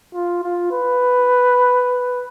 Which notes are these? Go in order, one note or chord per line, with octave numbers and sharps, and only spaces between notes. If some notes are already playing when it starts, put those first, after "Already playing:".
F4
F4
B4